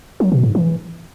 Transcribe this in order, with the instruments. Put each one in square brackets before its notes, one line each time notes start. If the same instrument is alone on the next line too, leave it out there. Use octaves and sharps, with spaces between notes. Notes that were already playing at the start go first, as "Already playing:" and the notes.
[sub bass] F#3
B2
G#2
E3